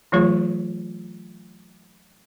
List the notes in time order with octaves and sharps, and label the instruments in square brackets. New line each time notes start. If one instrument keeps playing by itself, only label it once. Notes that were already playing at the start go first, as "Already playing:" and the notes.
[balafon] E3 F#3 A3 F4 G#4 C#5